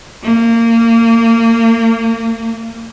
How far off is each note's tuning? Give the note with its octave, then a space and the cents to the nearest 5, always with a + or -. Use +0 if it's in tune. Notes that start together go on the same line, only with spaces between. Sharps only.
A#3 -25